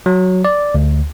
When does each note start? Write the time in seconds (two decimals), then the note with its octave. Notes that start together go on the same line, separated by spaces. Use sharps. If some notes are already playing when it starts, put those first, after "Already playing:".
0.06 F#3
0.45 D5
0.75 D2